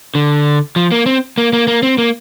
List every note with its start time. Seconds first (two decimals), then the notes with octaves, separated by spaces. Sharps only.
0.15 D3
0.76 F3
0.92 A#3
1.06 C4
1.38 A#3
1.53 A#3
1.68 A#3
1.83 C4
1.98 A#3